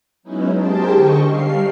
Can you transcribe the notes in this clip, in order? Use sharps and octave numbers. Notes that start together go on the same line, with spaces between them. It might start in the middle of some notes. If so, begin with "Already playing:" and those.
F#3 G#3 B3 C#4 D#4 E4
G4 G#4 A#4 C5 G5 A5
D3 A4 D#5 C#6
G3 F5 C7